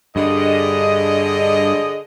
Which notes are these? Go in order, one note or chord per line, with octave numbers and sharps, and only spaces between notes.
G2 D3 G#4 D#5